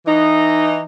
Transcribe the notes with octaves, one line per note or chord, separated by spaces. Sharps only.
E3 D#4